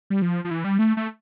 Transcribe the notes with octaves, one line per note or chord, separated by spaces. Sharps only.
G3
F3
F3
E3
G3
A3
A3